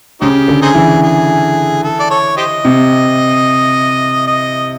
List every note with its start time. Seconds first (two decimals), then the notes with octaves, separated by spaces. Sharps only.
0.21 C#3 C4 D#4 G4
0.48 D3
0.62 C4 D#4 G#4
0.75 E3
1.03 G#4
1.83 A4
2.00 D5
2.11 A4 C#5
2.37 G4 C5 D#5
2.65 C3
4.27 D#5